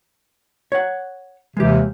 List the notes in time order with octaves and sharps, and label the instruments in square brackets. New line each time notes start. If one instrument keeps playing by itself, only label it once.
[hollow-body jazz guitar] C#5 F#5
[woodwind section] D#2 C3 E3 [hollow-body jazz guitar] G#3 G4